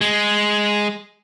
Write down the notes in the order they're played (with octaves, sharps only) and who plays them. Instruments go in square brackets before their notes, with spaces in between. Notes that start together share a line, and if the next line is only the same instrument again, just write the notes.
[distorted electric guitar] G#3